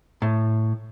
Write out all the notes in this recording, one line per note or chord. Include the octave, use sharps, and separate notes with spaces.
A2